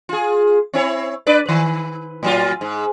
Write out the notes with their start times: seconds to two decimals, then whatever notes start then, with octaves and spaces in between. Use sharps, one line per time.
0.09 F4 G#4
0.73 C4 E4 C#5
1.27 D4 B4 D5
1.46 D#3 B4
2.23 A2 F#3 F4
2.61 G#2